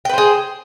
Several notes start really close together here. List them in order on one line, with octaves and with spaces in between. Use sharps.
G5 B4 C5 G#4